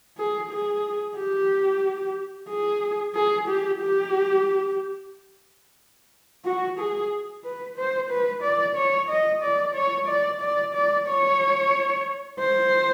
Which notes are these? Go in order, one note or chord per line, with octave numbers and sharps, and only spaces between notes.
G#4
G#4
G4
G#4
G#4
G4
G4
F#4
G#4
B4
C5
B4
D5
C#5
D#5
D5
C#5
D5
D5
D5
C#5
C5